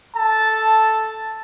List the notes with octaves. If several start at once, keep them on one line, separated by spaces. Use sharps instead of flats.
A4 A5